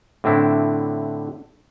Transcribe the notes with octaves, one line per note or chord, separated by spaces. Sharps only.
A2 D3 C4 D4 E4